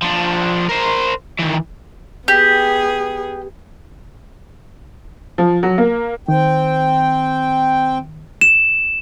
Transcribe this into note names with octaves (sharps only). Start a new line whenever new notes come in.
F3 D4
A#4 C5
D#3 E3
B3 G4 G#4
F3
F#3
A#3
D#3 C4 G5
E7